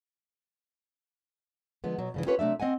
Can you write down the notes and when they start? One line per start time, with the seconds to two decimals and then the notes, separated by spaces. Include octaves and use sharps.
1.84 D3 F3 G#3 B3
1.99 B2 F#3
2.14 G2 C#3 E3
2.26 C#4 F4 G4 A4 B4 C#5
2.39 C3 F#3 A3 D4 E5
2.60 C4 D#5 F#5 G#5